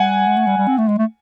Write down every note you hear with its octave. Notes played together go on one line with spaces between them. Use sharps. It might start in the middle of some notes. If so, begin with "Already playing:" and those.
Already playing: G3 F#5 G#5
G#3
A3
G3
G3
C4
A3
G#3
A3